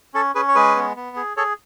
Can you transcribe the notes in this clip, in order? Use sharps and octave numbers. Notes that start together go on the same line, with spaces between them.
C#4 A4
C#4 G#4 B4
C#5
G#3 G#4 B4
B3
B3
G#4
G#4 A4 C#5